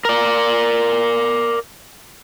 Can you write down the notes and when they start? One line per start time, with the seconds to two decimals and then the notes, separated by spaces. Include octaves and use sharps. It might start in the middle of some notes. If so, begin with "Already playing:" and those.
0.05 A#4 D5